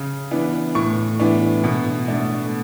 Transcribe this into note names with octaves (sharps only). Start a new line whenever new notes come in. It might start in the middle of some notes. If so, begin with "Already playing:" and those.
Already playing: C#3
E3 B3 D4
A2 C#6
E3 B3 D4
B2
A3 D4